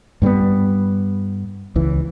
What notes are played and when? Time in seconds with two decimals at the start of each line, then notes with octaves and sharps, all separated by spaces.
0.22 G2 G3 A#3 B3
1.76 C#2 E3